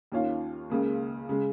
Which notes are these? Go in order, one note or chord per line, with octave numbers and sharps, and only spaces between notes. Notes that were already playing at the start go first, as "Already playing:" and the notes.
D#2 D#3 C#4 F4
C#2 C#3 A#3
C#3 G#3